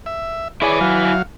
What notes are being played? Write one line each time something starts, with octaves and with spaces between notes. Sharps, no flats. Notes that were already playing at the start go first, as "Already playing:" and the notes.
E5
E4 G#4 C#5 D5 G#5
F#3 F5